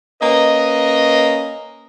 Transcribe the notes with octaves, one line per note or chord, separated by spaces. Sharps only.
A#3 C#4 B4 D#5